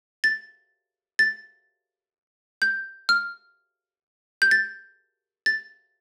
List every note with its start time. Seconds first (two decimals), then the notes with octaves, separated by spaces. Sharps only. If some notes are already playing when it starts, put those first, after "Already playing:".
0.24 A6
1.19 A6
2.62 G6
3.09 F6
4.42 G6
4.51 A6
5.46 A6